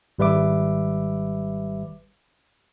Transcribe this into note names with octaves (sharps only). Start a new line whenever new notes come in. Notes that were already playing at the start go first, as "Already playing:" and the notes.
G#1 G3 B4 E5 D6